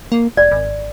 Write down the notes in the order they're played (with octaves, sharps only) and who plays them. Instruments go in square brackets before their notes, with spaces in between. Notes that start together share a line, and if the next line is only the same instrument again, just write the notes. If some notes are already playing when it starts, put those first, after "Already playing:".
[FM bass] A#3
[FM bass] F1 [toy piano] D5
[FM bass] G#1